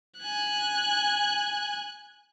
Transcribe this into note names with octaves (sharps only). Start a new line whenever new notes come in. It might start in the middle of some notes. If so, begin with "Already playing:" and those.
G#5 F#6